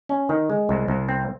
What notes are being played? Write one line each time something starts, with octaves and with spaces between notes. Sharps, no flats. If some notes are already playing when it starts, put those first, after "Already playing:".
C#4
D#3
G#3
C2
C2
C4